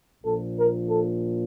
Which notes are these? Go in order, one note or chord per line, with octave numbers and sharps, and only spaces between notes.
A#1 A#2 F3 A4
A#4
A4